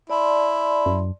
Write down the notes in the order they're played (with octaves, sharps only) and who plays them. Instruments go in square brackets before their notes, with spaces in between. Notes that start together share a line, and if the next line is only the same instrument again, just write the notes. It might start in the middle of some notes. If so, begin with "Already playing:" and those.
[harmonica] E4 [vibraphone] D5 A5 C6
[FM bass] F#2